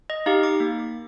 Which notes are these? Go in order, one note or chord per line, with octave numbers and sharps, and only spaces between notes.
D#5
D#4 G4 F5
D6
A#3